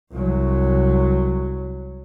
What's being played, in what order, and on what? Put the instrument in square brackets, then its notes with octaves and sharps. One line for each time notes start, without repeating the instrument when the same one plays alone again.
[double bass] C2 F#3